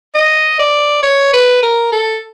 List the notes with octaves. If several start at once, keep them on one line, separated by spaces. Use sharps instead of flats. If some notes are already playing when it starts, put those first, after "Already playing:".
D#5
D5
C#5
B4
A#4
A4